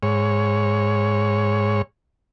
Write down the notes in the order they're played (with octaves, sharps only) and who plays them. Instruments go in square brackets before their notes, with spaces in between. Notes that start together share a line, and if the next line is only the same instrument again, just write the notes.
[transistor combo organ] G#2 C#5